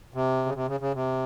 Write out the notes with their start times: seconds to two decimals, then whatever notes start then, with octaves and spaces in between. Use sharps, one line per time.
0.14 C3
0.46 C#3
0.54 C3
0.68 C#3
0.80 C#3
0.94 C3